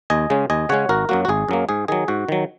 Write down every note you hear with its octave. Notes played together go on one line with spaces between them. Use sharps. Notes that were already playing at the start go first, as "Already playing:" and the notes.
D#2 D#5 G#5
C#3 G#3 C#4
D#2 D#5 G#5
C#3 G#3 C#4 C#5 F#5
G#1 F#4 A#4
F#2 F#3 A#3 F#4
F#4
G#1 G#4
F#2 F#3 A#3
G#2 G#4
D#3 F#3 G#4
G#2 F#4
D#3 F#3